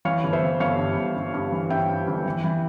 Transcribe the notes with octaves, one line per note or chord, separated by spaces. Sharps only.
E3 C#5 F5
G1
C5 E5
E3
G1 C#5 F5
G2
G1
G2
G2
E3
G2 E5 G5
G2
G1
E3
E3